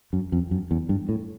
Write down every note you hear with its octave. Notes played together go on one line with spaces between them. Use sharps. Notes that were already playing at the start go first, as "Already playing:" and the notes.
F#2
F2
F#2
E2
G2
A2